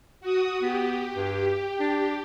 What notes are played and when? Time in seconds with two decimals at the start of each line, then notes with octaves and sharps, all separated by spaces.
0.21 F#4 D#6
0.62 B3 G4
1.16 G2
1.80 D4